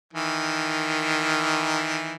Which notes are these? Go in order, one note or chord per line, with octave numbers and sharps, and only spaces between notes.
D#3 E3